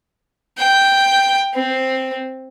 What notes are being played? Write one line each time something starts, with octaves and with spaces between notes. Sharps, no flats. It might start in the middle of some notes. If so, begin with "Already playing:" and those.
G5
C4